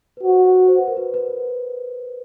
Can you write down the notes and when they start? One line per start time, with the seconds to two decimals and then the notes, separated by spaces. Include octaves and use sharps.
0.17 B4
0.24 F#4 C5
0.68 C5
0.78 B4
0.88 A#4
0.97 B4
1.14 B4